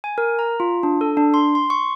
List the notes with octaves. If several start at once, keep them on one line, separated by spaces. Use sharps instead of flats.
G#5
A#4
A#5
F4
D4
A4
D4
C6
C6
C#6